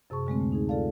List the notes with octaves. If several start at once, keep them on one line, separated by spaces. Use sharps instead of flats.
F#2 C3 G#4 A5 C#6
D3 G#3 A3 C4
D2
D#4 G#4
F4 A4 D5 F5 A5